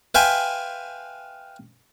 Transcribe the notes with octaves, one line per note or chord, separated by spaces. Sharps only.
B4 E5 F5 G5 G#5 C6